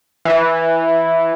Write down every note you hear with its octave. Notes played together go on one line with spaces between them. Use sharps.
E3